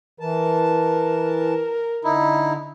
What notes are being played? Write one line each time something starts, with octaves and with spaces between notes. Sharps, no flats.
E3 A#4 A5
D3 D#4 E4